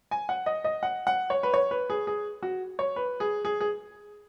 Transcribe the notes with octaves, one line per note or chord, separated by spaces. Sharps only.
G#5
F#5
D#5
D#5
F#5
F#5
C#5
B4
C#5
B4
G#4
G#4
F#4
C#5
B4
G#4
G#4
G#4